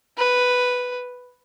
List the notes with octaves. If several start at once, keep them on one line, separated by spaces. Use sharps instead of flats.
B4